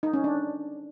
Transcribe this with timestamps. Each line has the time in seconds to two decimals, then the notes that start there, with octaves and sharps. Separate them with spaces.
0.03 D#4
0.14 C#4
0.24 D4